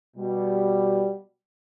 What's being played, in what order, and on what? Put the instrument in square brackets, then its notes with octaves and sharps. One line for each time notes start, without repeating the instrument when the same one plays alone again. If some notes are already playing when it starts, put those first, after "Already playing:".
[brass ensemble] B2 G3